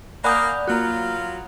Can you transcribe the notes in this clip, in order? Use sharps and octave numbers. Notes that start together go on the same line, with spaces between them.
A#3 D5 F#5 G#5 B5 D#6 F#6 G6
F#3 A#3 F4 F#4 A#5 F#6